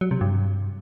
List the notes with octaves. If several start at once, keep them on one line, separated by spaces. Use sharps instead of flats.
F#3
C3
G2